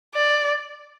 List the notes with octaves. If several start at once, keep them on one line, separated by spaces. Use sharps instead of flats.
D5